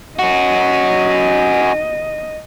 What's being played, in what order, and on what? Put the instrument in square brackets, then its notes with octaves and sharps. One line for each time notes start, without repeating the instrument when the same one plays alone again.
[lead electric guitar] C#4 F#4 [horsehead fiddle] D#5